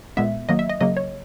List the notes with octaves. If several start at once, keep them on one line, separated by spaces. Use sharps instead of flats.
A#2 G#3 B3 E5
D#3 F#3 A#3 D#5
E5
D#5
C#3 F#3 A#3 D#5
C#5